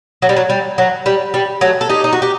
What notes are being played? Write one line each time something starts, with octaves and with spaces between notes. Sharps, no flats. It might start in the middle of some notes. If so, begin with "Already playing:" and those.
F#3
G3
F#3
G3
F#3
G3
G3
F#3 A3
A4
D#4 G4
D#4
F#4
G4